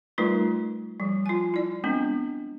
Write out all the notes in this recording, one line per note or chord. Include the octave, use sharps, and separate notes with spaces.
G3 A3 D#4 F4 A#4 B4
F3 G3
F4 G#5
E4 D5
G#3 B3 C4 D4